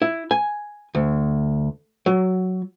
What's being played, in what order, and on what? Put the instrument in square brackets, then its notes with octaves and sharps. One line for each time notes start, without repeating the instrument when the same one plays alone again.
[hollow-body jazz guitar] E4
G#5
D2
F#3